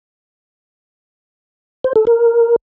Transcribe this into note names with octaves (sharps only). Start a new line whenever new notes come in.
C5
A4
A#4